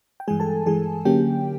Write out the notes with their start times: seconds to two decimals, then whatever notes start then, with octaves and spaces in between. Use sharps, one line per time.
0.20 G5
0.28 G2 E3 G#3 G#4 G#5
0.40 A4 A5
0.66 G2 E3 G#3 G#4 G#5
1.05 D3 F#3 A#3 C#4 G4 G5